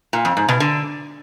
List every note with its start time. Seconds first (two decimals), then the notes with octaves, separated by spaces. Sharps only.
0.13 A#2
0.25 F2
0.37 G#2
0.49 B2
0.60 D3